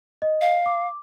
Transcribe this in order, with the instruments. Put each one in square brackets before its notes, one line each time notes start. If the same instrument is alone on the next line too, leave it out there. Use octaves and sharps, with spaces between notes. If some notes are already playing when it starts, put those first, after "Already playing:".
[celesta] D#5
[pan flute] F5
[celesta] D6